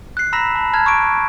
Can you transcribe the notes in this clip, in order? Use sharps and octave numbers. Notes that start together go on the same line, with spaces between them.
F#6 C7
A#5 B5 E6 A#6 B6 E7
A5 B5
A5 A#5 F6 G#6
C#6 D6 D7